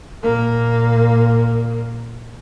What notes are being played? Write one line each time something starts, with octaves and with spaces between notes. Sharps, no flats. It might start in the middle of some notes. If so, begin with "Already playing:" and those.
A#2 A#3